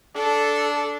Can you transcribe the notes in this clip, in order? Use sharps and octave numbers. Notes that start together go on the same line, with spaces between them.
D4 A4